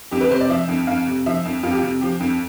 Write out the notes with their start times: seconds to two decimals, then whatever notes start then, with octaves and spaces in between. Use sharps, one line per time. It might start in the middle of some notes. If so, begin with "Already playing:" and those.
0.11 F2 G4
0.21 B4
0.31 C3 C5
0.41 D5
0.49 F3 E5
0.68 F2
0.87 F2 F5
1.07 C3
1.26 F3 E5
1.45 F2
1.63 F2 F4
1.71 G4
1.78 F4
1.83 C3
2.01 F3 G4
2.20 F2